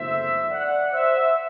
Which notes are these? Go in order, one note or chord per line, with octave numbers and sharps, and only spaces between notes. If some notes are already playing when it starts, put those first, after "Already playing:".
Already playing: F#1 E2 D3 F#3 A3 C5 E5
D5 F#5
C5 E5